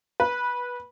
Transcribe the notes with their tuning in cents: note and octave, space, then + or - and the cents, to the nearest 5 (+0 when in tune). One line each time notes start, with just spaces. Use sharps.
B4 -15